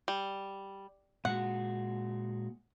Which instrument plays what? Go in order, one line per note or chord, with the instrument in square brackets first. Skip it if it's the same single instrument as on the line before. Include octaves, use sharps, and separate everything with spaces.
[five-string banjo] G3
[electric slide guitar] A#2 G#3 F#4 [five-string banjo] F#5